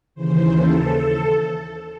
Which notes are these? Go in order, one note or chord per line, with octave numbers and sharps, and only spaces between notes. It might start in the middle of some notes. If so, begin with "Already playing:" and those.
D#2 C#3 E3 C5
A4